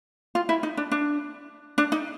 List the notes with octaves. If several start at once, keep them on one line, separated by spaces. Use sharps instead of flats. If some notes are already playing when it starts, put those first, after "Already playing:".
F4
E4
D#4
D4
D4
D4
D#4